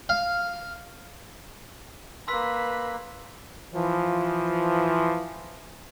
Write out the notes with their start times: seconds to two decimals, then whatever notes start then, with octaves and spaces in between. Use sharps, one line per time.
0.09 F5
2.28 A#3 B4 C6 E6 B6
3.74 E3 F3